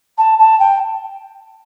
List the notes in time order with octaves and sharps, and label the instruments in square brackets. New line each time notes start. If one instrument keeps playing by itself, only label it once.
[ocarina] A5
A5
G5